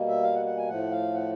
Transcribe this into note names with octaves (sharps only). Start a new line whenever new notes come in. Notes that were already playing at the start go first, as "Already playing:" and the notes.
Already playing: B2 G3 A#3
E5
F5
F#5
F#5
G#5
A2 F3 A3 F#5
F5
F#5